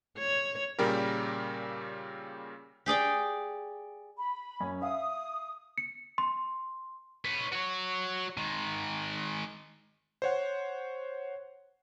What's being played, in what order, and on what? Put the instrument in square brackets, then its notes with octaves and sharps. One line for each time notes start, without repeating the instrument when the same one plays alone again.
[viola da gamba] C#5
[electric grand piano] A#2 C#3 G3 G4 A#4
[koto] G4 G#4 D5 G5
[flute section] B5
[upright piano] F#2 C#4 G#5
[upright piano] E5 F5 [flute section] D#6
[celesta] C#7
C6
[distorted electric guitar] B4 C#5
F#4 C#5
D#3 G#3
[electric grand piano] C5 C#5 F#5